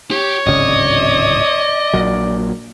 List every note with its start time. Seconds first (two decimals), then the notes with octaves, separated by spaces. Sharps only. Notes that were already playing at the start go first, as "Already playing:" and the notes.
0.11 G4 C#5
0.47 D1 G#1 C#3 D5 D#5
1.94 A#1 A#2 F#3